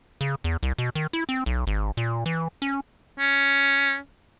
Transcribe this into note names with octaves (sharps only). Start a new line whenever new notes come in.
C#3
E2
C2
B2
D#3
E4
C4
B1
G#1
A#2
E3
C#4
C#4